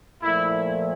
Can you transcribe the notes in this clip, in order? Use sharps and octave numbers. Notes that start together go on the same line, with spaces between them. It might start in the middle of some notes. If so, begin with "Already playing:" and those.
A#2 F3 A3 E4